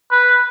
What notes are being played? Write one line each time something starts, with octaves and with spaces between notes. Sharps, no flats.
B4